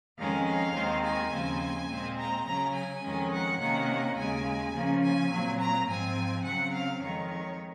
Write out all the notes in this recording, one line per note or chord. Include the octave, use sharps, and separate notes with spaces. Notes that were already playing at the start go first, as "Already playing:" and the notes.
F2 D#3 G#3 C#4 F5
F5
D#2 D#3 G#3 C4
G#5
D#2 C#3 F3 C4
A#2 G#3 C4
A#5
C#3 F#3 C#4 A#5
G#5
F2 D#3 G#3 C#4
F#5
C3 D#3 A#3 C#4 F#5
D#2 C#3 G#3 G#5
C#3 F3 A#3 C#4
G#5
A#2 F#3 C4
A#5
G#2 F3 C4 G#5
C#3 F#3 C4 F#5
F5
F2 D#3 G#3 C#5
C#5